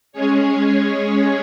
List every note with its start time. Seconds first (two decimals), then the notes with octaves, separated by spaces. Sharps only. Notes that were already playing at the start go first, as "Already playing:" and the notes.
0.12 G#3 C#4 G#4 C#5